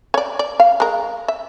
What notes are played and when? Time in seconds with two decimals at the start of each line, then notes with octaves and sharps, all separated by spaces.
0.14 C#5 D5
0.39 D5
0.60 F5
0.80 G#3 A#4
1.28 E5